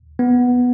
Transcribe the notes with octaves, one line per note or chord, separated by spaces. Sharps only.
B3